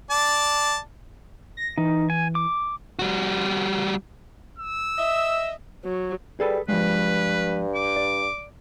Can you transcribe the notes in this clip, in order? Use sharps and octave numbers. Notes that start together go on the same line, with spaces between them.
D5 A5
A#6
E3 D#4
G#5
D6
G3 F#4
E6
D#5 E5
F#3
G3 G#4 A4 B4
G2 F3 G#3 B4
D6
D5